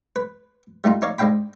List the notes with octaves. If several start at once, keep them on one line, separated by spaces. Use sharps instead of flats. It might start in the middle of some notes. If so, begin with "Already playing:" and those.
B4
G3 A3 D#4 F4
D#4 C#5 D5 F5
G#2 G#3 D4 F5 G5 B5